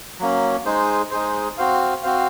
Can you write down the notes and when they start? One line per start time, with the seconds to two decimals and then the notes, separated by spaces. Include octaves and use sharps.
0.20 F#3 A#3 C#4
0.66 G#3 D#4 G#4 C5
1.11 G#3 D#4 G#4 C5
1.58 C4 F#4 C5 F5
2.03 C4 F#4 C5 F5